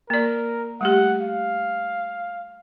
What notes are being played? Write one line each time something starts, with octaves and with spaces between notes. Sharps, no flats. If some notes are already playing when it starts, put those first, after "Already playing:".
A#3 A#4 D5
G3 A3 G4 F#5
F5